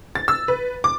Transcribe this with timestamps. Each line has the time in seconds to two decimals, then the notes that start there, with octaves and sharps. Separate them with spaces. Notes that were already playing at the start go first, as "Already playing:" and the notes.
0.15 A6
0.28 E6
0.48 B4
0.84 D6